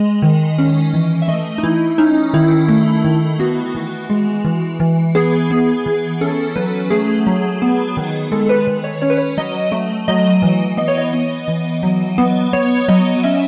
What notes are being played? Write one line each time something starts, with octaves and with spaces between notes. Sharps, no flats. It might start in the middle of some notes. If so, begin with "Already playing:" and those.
Already playing: G#3 D#5
D#3
C#4
E3
E5
A3 D#5
D#4
E3 E4
C#4 D#4
D#3 E4
A3
D#3
B3 F#4
E3
G#3
E3
E3
B3 G#4
B3
E3
C#4 A4
F#3 B4
A3 G#4
F#3
B3
D#3
G#3 A4
B4
D#3 B4
C#5
C#4 C#5
B4
C#5
F#3 D#5
A3
F#3 D#5
E3
B3 D#5
C#5
D#5
B3
E3
F#3
B3
B3 C#5
F#3 D#5
C#4 E5